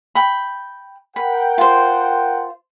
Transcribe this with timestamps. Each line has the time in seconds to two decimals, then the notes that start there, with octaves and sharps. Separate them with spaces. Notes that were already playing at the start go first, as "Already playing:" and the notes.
0.15 G5 B5
1.16 A#4 F#5 G5 B5
1.58 F4 C5